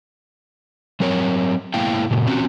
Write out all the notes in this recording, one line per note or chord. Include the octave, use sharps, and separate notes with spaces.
F#3 C4 A#4 C#5
G#2 A#3 E4 F5 G5
A#2 C#3
C4 C#4 F#4